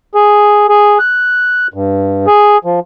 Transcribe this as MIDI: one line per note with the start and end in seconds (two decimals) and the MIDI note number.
0.15 0.66 68
0.69 0.98 68
0.99 1.67 90
1.74 2.26 43
2.27 2.58 68
2.65 2.80 53